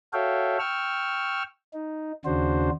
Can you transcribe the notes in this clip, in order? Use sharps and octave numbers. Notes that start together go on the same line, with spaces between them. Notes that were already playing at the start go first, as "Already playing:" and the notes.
F#4 A4 C#5 E5 F5 G5
G5 C#6 E6 F6
D#4
D#2 C#3 D4 F#4 C5